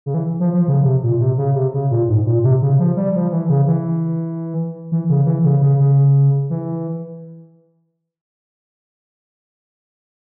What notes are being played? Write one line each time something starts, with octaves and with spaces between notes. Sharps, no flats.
C#3
E3
F3
F3
C#3
C3
A#2
C3
C#3
C3
C#3
A#2
G#2
A#2
C3
C#3
F3
G3
F3
E3
C#3
E3
E3
C#3
E3
C#3
C#3
C#3
E3